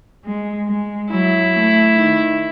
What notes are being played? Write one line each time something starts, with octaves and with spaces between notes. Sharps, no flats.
G#3
G#3
F#3 E4
A3
D#3